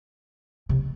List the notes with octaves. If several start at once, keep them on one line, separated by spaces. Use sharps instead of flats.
C3